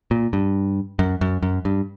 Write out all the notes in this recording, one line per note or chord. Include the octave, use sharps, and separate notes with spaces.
A#2
G2
F#2
F#2
F#2
G2